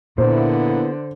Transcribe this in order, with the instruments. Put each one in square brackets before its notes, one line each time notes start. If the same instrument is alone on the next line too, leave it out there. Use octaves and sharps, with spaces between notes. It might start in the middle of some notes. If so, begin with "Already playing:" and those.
[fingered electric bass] A#2 [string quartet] D3 [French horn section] A#3 B3 E4 [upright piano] C5